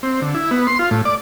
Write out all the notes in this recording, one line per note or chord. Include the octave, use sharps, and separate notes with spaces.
C4
D3
E4
B3
C6
F4
A2
D5